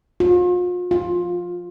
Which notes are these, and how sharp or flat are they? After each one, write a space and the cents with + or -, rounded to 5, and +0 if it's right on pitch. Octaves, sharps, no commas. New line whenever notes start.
F4 +40
F4 +15